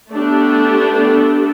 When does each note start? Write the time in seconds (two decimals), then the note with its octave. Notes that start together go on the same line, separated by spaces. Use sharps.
0.13 A3 B3 D4 G4 A4